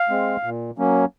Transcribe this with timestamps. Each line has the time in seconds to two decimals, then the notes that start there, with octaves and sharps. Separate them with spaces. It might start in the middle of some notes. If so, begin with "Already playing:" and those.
Already playing: F5
0.09 G#3 C4
0.43 A#2
0.78 F#3 A#3 C#4